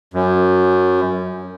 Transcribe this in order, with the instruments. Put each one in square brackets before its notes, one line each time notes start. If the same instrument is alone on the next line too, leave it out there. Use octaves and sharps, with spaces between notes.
[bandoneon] F#2